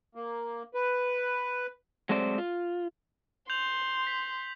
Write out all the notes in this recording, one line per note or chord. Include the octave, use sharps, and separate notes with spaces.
A#3
B4
F#3 G#3 A3 C4 C5 D5
F4
C6 G6 F7 F#7
B6